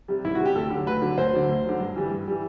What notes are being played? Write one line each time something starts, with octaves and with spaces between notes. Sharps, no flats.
C3 G3
C2 E4
F#4
C3 G3
G4
D2 A4
D3 F#3
D2 B4
D3 F#3
D2 C5
D3 F#3
D2
D3 F#3
G2
E3 G3
G2
E3 G3